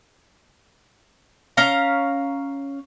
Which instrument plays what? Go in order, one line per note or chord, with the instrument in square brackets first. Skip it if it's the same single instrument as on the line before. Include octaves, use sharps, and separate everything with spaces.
[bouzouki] C#4 F5 A#5